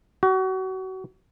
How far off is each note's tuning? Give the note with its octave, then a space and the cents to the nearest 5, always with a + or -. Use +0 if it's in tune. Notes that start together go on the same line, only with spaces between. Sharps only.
F#4 +30